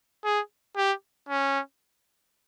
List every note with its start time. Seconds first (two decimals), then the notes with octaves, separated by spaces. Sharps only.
0.24 G#4
0.77 G4
1.29 C#4